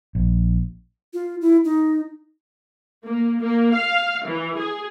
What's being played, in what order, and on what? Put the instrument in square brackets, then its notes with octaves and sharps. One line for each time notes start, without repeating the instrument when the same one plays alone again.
[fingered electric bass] A#1
[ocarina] F4
E4
D#4
[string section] A#3
A#3
F5
E3
G#4